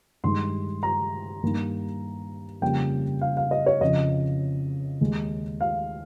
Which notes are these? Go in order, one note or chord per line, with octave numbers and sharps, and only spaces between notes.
G2 D#3 G#3 C6
A#5
G2 D#3 A#3
F2 C#3 G3 A#3 G5
F5
F5
D#5
C#5
F2 C#3 F3 D#5
D#2 D#3 G#3
F5